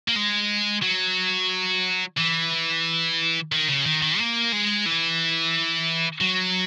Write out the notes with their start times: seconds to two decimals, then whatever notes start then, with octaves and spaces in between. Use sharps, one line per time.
0.08 A#3
0.16 G#3
0.82 F#3
2.17 E3
3.52 D#3
3.68 C#3
3.85 D#3
4.02 D#3
4.19 A#3
4.53 G#3
4.86 E3
6.21 F#3